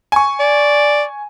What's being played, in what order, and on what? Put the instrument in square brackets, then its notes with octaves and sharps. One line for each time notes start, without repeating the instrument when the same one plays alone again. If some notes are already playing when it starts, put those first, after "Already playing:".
[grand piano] G#5 C#6
[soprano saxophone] D5